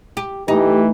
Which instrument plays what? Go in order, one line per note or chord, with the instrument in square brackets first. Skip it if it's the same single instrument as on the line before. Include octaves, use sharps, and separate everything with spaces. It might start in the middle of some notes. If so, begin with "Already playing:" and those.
[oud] G4
[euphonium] E3 [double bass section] A3 [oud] D#4 [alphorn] G4